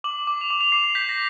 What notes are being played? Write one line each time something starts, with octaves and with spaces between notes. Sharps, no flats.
D6 F#7
D6
F7
D6 F#7
F7
D6 C7
C7
G6 B6
A#6